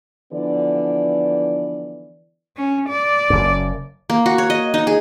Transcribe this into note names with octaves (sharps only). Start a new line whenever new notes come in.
D3 E3 F3 B3 D5
C#4
D5
F#1 F#2
A#3
F#4
C#5
D#5
D#4
G#4